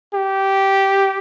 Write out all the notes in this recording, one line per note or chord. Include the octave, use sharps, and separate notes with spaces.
G4